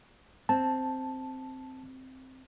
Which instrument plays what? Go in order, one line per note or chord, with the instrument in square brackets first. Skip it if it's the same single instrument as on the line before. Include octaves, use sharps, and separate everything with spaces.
[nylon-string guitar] C4 [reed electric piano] A5